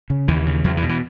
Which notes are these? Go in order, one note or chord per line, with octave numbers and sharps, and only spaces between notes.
C#3
D#2 E3
C#3
E2 F#3
E3
B2
E3